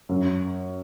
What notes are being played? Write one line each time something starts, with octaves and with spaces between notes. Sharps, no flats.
F#2